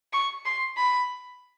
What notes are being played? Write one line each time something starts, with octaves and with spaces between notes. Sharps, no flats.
C#6
C6
B5